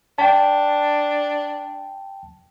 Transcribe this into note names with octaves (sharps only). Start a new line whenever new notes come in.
D4 G5 A5